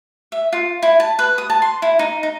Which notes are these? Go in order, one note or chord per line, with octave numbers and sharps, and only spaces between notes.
E5
F4
E4
A5
B4
D#6
A5
C6
E4
D#4
D#4